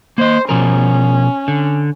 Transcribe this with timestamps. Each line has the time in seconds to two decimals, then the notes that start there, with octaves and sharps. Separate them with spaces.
0.18 A#3 C5 D#5
0.49 B2 F3 C#4 A#4
1.48 D3